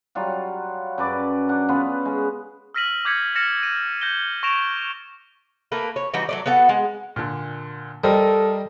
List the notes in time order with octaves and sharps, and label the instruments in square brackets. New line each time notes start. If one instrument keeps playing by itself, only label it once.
[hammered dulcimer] F#3 G3 F4 F#4
F#2 B4 D5 D6
D4 F#5
B3 C#4 F4 B4
G#3
[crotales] E6 F6 A#6 B6 D#7 F#7
D6 G6 G#6 B6 C#7
F6 A6 A#6 C#7 E7
D#7
G6 A#6 D#7 G7
C#6 A#6 D7 E7 F7
[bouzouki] A3 A#3 B4
C#5
E3 G3 D#4 F#4
F#3 A3 D5
B3 F#4 A4 F#5
G#3
[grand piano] A#2 D3
[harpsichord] G3 [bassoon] A4 [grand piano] A#4 C5 D#5